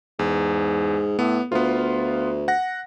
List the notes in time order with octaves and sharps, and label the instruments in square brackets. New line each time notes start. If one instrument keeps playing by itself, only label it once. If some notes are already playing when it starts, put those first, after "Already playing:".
[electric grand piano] E2 [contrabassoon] G#2
[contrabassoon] A2 [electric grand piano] B3
[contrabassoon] D2 [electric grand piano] B3 F4
[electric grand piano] F#5 A#6